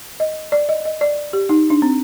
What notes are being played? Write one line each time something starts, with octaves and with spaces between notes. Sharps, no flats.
D#5
D5
D#5
D#5
D5
G4
D#4
D4
C4